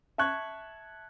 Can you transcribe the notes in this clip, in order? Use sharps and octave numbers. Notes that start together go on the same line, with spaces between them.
E5 A5 C#6 F#6 G#6